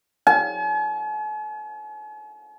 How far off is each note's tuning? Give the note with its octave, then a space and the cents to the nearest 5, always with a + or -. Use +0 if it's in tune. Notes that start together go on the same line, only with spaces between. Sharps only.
G#5 +45